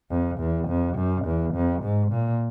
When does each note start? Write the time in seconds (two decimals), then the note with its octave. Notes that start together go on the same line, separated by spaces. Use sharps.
0.11 F2
0.39 E2
0.69 F2
0.97 F#2
1.25 E2
1.54 F2
1.83 G#2
2.12 A#2